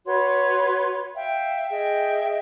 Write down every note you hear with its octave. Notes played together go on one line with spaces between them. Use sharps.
F#4 B4 C#5 C6
E5 F5 G5
G#4 D#5 E5 G5